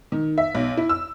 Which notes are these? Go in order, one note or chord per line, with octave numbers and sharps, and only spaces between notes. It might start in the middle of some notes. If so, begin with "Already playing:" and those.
D#3
E5
B1
E4
E6